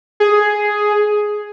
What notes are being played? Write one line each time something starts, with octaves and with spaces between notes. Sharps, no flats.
G#4